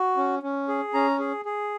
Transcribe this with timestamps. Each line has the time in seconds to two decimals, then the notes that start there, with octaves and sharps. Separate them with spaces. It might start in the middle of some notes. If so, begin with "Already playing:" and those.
Already playing: F#4
0.17 C#4
0.43 C#4
0.68 G#4
0.94 C#4 A#5
1.19 G#4
1.45 G#4